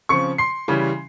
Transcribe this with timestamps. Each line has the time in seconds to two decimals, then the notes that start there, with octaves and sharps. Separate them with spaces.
0.09 C#3 F3 C4 C#6 C#7
0.38 C6 C7
0.68 C#3 E3 G3 C#4